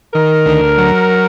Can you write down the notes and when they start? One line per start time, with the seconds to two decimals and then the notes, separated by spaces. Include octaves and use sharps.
0.14 D#3 A#4
0.46 D2
0.78 F#3